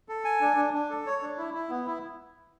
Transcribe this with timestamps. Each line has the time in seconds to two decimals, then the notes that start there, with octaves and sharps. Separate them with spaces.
0.09 A4
0.25 G#5
0.41 D4
0.57 D4
0.74 D4
0.90 A4
1.06 C#5
1.22 D4
1.38 E4
1.54 E4
1.70 B3
1.86 E4